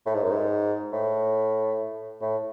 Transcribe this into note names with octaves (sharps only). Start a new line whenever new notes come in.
A2
G#2
F#2
G#2
A2
A2